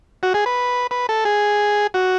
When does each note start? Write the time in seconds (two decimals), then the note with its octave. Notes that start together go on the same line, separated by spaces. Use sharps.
0.23 F#4
0.34 G#4
0.46 B4
0.91 B4
1.09 A4
1.25 G#4
1.94 F#4